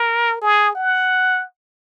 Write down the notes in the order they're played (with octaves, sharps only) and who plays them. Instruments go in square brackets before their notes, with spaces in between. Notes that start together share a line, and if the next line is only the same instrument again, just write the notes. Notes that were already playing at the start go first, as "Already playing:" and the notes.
Already playing: [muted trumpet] A#4
G#4
F#5